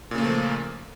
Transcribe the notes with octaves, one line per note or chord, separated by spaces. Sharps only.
A#2 C#3 F3 A3 A#3